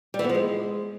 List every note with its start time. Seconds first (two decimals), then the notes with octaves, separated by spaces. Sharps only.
0.14 G3
0.19 E3
0.24 B3
0.29 F3
0.35 G#3